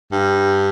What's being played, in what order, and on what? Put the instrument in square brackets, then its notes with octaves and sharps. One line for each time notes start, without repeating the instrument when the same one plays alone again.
[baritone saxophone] G2